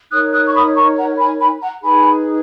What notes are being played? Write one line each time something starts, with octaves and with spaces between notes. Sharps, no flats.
D#4 A#4 C#5 D#6 F#6
D#6 F#6
C#6
B5 D#6
A#5 C#6
F#5 A#5
G#5 B5
G#5 B5
F#5 A#5
D#4 G#4 B4 G#5 B5